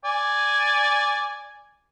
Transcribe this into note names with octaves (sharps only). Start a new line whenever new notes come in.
D5 G#5